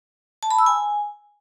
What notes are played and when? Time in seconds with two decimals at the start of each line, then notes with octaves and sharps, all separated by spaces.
0.43 A5
0.51 B5
0.58 E6
0.66 G#5